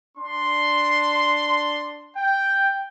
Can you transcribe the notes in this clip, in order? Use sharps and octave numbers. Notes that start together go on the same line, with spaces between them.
D4 C6
G5